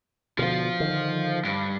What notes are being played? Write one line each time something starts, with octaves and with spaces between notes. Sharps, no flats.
B2 D3 F3 F4
D3 D#3
G2